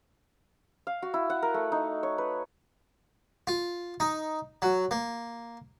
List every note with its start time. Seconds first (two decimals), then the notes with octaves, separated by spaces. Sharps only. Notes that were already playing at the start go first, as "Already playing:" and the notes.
0.87 F5
1.02 F#4
1.14 E4
1.30 F#5
1.43 A#4
1.54 A3
1.72 D#4
2.03 C#5
2.18 B4
3.47 F4
4.00 D#4
4.62 F#3
4.91 A#3